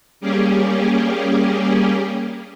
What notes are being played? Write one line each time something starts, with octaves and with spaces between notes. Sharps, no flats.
G3 A#3 C#4 G4 G#4